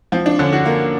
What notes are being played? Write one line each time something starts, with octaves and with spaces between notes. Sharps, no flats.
F3 C4
D4
D3 C#4
F#4
A#3